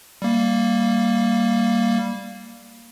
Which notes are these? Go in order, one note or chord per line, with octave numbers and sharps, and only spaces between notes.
G3 A#3